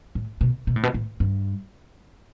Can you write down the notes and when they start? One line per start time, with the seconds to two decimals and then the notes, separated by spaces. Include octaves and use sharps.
0.15 A2
0.41 B2
0.67 B2
0.76 A2
0.83 B2
0.94 A2
1.20 G2